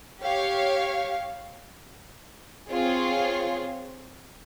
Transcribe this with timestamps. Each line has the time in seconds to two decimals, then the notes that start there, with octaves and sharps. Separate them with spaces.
0.23 G4 C#5 F5
2.70 C4 F4 G#4 C#5